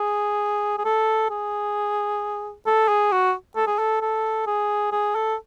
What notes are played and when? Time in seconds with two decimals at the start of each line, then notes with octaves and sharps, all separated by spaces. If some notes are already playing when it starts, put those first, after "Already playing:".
Already playing: G#4
0.78 G#4
0.85 A4
1.30 G#4
2.67 A4
2.89 G#4
3.12 F#4
3.57 A4
3.67 G#4
3.79 A4
4.02 A4
4.47 G#4
4.92 G#4
5.15 A4